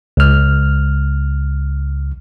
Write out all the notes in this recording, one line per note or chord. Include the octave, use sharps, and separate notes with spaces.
C#2 F6